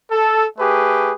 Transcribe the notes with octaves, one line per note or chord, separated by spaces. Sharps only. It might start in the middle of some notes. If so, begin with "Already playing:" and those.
A4
A3 G4 G#4 B4